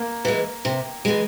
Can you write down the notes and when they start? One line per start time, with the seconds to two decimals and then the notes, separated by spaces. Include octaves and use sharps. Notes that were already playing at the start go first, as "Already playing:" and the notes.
Already playing: A#3
0.25 E3 G#3
0.65 C3
1.05 E3 G#3